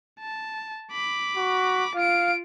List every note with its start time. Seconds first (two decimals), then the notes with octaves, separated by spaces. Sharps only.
0.20 A5
0.92 B5 D6
1.37 F#4
1.96 F4 F5 D7